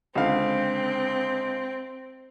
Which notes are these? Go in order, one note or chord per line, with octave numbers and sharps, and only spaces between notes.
C#2 D3 C4 F5